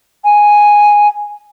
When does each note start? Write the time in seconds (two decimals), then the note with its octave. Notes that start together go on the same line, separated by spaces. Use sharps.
0.25 G#5